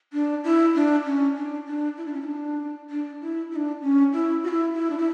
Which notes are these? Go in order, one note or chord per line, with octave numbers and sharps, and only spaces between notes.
D4
E4
D4
C#4
D4
D4
E4
D4
C#4
E4
D4
D4
E4
E4
D4
C#4
E4
F#4
E4
E4
D4
E4